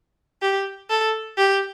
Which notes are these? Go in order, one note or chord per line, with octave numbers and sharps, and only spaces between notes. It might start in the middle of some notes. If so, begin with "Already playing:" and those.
G4
A4
G4